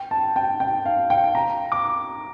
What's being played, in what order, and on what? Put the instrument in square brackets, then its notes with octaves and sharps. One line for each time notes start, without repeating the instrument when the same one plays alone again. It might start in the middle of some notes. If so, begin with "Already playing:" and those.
Already playing: [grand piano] G5
A5
G5
G5
F5
G5
A#5
D6